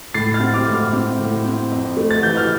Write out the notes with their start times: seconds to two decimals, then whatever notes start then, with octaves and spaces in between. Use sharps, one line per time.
0.14 A2 A6 C7
0.34 F6 A6
0.40 C4
0.54 D6 F6
0.67 A2
0.73 D6 F6
0.93 C4
1.19 A2
1.45 C4
1.71 F2
1.97 A3
2.11 A6
2.22 E3 G6
2.37 F6